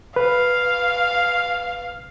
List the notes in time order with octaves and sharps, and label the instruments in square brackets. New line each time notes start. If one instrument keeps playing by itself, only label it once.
[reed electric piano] B4 [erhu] F5